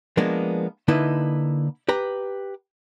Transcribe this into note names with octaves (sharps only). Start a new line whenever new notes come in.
F3 G#3 A#3 B3 D4
D3 A#3 D#4 E4 B4 D#5
G4 B4 A#5